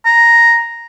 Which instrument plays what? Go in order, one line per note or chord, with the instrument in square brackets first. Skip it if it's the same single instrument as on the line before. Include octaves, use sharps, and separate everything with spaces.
[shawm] A#5